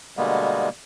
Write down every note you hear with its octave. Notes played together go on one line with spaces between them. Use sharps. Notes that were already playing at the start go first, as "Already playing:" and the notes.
B2 D3 G3 G#3 A#3 B3